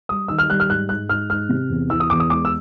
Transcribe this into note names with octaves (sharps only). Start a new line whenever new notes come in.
G3 D#6
D#3 E6
F6
G3 F#6
F6
G#2 F#6
G#2 F#6
G#2 F6
G#2 F6
C3
E2
E3 E6
D#6
E2 D6
D#6
G#3 D6
E6